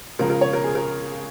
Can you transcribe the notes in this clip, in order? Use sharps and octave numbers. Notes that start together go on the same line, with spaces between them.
C#2 C#3 F3 A#4
A#4
C#5
A#4
G#4
A#4